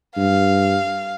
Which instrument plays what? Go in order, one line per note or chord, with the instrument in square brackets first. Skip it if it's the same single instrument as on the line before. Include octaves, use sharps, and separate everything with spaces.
[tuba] G2 [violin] F5